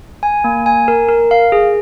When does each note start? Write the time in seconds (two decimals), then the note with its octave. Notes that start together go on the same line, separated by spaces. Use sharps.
0.23 G#5
0.44 A#3
0.66 G#5
0.88 A#4
1.09 A#4
1.31 F5
1.52 G#4